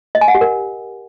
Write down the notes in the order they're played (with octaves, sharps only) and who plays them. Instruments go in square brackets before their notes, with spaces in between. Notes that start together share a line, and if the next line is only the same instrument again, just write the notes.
[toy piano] D#5
G#5
F#5
G4
A#4